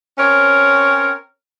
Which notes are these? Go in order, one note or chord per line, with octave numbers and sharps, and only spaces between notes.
C4 C#4 A#4 C#5